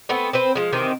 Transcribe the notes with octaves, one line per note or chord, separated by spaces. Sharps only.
A3 B3 C4
C4 B4 C5
F3 G#3
C3 D#3 E3 C4